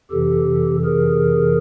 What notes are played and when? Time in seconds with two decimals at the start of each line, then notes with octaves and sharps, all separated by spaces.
0.11 F2 C3 E3 G4 A4
0.84 G#4 A#4